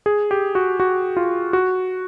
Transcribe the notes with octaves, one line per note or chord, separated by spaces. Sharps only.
G#4
G4
F#4
F#4
F4
F#4